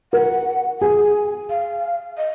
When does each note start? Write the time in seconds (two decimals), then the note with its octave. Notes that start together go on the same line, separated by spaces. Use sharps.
0.13 A#4 F#5
0.81 G#4 G#5
1.50 F5
2.17 D#5